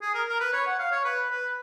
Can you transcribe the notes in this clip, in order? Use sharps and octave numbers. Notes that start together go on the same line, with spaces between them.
G#4
A#4
A#4
B4
C#5
F#5
F5
C#5
B4
B4